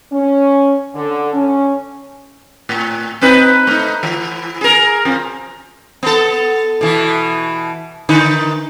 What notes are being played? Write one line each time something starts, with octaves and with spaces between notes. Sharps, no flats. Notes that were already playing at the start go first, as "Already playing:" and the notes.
C#4
D3
C#4
A2
C4 D#4 B4
A3 D#4
E3
G#4 A#4
F2 F3
B3 A4
B2 E3
D3 D#4 B4